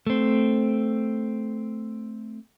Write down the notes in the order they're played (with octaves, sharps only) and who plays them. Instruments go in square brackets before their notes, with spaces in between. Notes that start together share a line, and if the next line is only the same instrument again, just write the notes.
[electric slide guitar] A3 C4